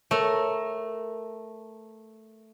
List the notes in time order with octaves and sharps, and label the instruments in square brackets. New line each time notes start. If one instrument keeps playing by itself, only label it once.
[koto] A3 [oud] A#4 C#5